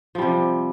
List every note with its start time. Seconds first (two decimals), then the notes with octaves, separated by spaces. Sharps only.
0.15 F3
0.18 G3
0.22 C3